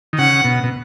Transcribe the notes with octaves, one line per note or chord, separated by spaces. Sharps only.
D#3
C#3 F#5
B2
B2